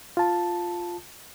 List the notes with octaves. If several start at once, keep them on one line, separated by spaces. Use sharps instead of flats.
F4 A5